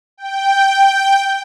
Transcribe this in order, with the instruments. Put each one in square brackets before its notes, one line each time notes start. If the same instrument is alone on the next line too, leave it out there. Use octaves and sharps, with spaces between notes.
[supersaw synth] G5